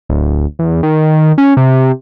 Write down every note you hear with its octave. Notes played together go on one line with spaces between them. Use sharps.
D1
E2
D#3
C#4
C3